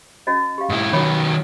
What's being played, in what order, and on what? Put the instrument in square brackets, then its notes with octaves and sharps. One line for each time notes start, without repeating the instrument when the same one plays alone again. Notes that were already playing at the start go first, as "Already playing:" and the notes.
[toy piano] C#4 F#4 D#5
G4 F5
[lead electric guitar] G#2 E4 [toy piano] F#5
[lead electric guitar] D#3 F#3 [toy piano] C#5 B5 D6